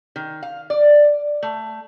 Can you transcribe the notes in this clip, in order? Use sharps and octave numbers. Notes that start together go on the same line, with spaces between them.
D#3
F5
D5
A3